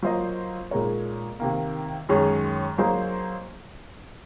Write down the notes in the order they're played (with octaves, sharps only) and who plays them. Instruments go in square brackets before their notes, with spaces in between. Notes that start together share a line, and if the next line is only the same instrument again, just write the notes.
[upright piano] F#3 A#3 F4 C5 D#5
A#2 G#3 D#4 A#4 C#5
C3 D#3 A#3
F#2 D#3 G#3 C#4
F#3 A#3 D#4 G#4 C5